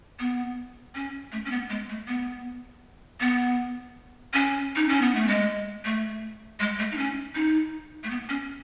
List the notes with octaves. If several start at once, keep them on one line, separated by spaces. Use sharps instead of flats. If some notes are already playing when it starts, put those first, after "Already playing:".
B3
C#4
A3
C#4
B3
G#3
A3
B3
B3
C#4
D#4
C#4
B3
A3
G#3
A3
G#3
A3
D#4
C#4
D#4
A3
B3
C#4